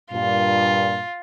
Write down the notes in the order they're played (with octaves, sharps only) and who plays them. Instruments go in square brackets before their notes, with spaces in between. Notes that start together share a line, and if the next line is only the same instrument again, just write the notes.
[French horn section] G2 A#2 [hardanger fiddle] F4